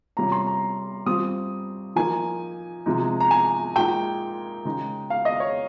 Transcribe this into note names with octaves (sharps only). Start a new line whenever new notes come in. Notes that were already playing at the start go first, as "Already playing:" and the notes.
C3 G3 C#4 F4 A#5
C6
A#5
G3 C4 F4 D#6
F3 A#3 D#4 G#5
C3 F3 G#3 D#4
A#5
G#5
A#2 G#3 D#4 G5
C#3 G#3 D#4
F5
D#5
C#5